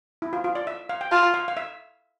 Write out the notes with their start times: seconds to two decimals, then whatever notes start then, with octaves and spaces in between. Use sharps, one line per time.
0.22 E4
0.33 F4
0.44 F4
0.55 D5
0.67 E5
0.89 F5
1.01 G5
1.12 F4 A5
1.34 F5
1.48 F5
1.57 E5